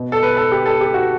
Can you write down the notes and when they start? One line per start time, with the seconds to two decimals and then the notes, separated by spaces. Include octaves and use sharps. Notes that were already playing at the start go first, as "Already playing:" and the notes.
Already playing: B2
0.12 A4
0.23 B4
0.37 A4
0.52 G4
0.65 A4
0.81 G4
0.94 F#4